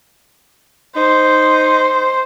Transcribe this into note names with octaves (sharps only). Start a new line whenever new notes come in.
D#4 C5